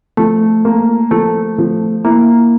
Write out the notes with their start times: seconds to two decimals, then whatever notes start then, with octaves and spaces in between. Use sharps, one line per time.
0.17 F3 A3
0.65 A#3
1.11 F3 A3
1.58 F3
2.04 A#3 E4